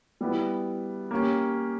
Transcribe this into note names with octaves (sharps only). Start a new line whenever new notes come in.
G3 B3 E4
A#3 C#4 G4